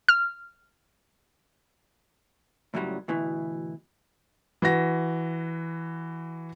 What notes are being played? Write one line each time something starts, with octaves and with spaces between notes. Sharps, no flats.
F6
C#2 F#2 A2 F#3 G3
D2 B2 E3
E3 F#4 A#6